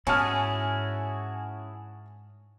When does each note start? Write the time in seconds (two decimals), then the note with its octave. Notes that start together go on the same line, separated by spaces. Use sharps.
0.07 G#2 C#4 E4 F#4 G#4 G#5 A5 F6